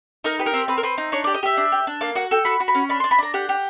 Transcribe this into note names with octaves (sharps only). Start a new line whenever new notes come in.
D#4 A#4
G4 B4
A#4
C4
C4 B4
A#4
C4 B4
D#4
D4 C#5
D5
G4
D#5
G4 E5
D4
G4
D4
A#3 F5
F#4 F#5
A4 G5
F#4 B5
F#4
B5
C#4
D4 B5
C6
D4
B5
D4 A#5
G4 F#5
G4